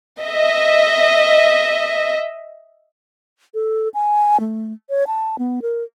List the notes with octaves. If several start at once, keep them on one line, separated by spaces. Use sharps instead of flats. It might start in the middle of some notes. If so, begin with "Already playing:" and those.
D#5 E5
A4
G#5
A3
C#5
A5
B3
A#4